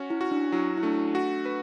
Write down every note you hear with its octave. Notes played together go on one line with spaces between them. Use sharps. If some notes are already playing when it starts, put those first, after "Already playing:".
Already playing: C#4 F#4
E4
F#4
D4
F#3 E4
E4
A3 D4
F#4
B4